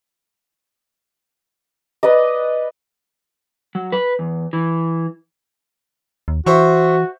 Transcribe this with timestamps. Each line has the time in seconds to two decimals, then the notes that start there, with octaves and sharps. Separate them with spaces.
2.03 B4 D5 D#5
3.75 F#3
3.92 B4
4.19 E2
4.53 E3
6.28 D#2
6.46 E3 F#4 C5 E5 C#6